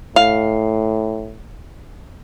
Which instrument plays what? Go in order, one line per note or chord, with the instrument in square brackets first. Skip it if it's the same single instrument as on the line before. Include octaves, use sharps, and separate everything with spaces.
[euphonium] A2 [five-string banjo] F5